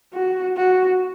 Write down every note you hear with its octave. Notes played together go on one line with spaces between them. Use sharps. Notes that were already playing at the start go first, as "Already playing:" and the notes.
F#4
F#4